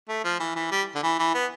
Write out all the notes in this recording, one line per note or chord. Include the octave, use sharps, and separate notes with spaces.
A3
F3
E3
E3
G3
D3
E3
E3
B3